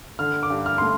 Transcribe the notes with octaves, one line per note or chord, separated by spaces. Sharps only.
D3 F6
D6
G2
F6
A3 C6